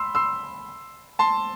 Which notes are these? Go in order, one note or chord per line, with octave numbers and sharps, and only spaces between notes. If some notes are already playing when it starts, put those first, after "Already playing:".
Already playing: B5 C6 E6
C6 E6
A5 C6